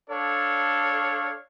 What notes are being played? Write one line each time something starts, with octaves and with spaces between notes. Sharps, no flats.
D4 A4 C#5 F5